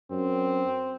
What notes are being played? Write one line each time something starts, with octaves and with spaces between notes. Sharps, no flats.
F#2 C4